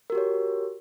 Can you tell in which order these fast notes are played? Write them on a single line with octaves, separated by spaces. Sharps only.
A#4 F#4 G4 C#5